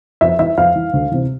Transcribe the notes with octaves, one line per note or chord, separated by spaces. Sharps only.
F2 E5
E3 E5
F2 F5
E3
D2
C3 E3